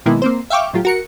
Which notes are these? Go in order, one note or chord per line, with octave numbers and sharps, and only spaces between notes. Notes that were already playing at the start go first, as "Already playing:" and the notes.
B2 D#3 G#3 A#3 B3 E4
A#3 C4 C5
E5 F5 G5 C#6 D6
A2 F#3 F4 G4
F#4 A#4 C#7